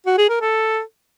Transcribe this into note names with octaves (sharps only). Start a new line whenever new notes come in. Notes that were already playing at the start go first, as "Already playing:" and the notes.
F#4
G#4
A#4
A4